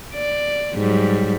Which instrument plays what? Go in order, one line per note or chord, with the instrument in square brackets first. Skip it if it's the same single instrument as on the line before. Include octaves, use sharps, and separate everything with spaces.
[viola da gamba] D5
G#2 F#3 G3